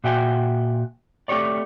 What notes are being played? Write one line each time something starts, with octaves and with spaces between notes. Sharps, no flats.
A#2 F#4 E5 G5 G#5
A3 C4 G4 C#5 D5